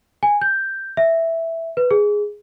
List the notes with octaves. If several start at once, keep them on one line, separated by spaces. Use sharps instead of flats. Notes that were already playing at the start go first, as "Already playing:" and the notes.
G#5
G6
E5
B4
G#4